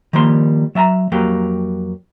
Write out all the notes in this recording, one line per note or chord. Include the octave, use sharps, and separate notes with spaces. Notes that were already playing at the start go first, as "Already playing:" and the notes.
D#3 F3 G3 A#3 C6
F#3 E5 A5 A#5
F2 F#3 A#3 G4